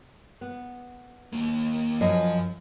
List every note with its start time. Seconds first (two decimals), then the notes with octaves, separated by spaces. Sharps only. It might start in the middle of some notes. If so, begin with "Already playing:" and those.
0.41 B3
1.33 D#2 A#3
2.01 F#2 F3 D#5 G#5